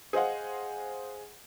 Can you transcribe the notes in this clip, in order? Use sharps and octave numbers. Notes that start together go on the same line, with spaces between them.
G#4 C5 D#5 F5 F#5